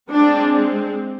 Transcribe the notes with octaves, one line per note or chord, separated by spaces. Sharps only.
G#3 C4 D4